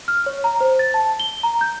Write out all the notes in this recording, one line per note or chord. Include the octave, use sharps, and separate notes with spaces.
F6
C#5
A#5
C5
A6
A5
G7
A#5
G6